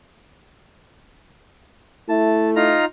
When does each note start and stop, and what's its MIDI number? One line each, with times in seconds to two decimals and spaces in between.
2.09 2.76 57
2.09 2.68 64
2.09 2.50 81
2.56 2.85 63
2.56 2.85 65
2.56 2.85 82